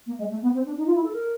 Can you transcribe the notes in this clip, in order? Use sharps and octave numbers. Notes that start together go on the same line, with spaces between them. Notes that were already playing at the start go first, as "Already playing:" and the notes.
A#3
G#3
A3
B3
C4
D4
D#4
F4
E4
A4
A#4